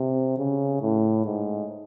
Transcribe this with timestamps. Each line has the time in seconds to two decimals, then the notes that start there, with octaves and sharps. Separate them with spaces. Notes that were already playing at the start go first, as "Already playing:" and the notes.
Already playing: C3
0.38 C#3
0.81 A2
1.26 G#2